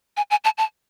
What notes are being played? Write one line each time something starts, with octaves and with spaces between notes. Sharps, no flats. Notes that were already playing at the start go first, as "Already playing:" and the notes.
G#5
G#5
A5
A5